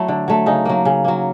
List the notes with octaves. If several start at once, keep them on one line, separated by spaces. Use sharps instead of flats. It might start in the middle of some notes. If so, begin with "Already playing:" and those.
Already playing: F#3 A3 E4
D3
F#3 A3
C#3 D#4
F#3 A#3
C#3
F#3 A#3